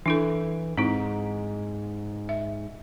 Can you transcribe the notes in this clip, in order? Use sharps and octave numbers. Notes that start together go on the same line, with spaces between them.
E3 D4 E4 A4
G#2 C4 D#4 E4
E5